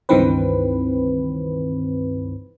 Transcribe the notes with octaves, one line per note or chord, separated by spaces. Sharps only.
C#2 G2 D#3 E3 C4 B4